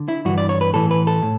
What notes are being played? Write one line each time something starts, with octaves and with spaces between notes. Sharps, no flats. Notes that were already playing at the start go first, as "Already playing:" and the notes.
Already playing: D3
E4
G2 E3 F#4
D5
C#5
B4
A2 E3 A4
B4
A4
A2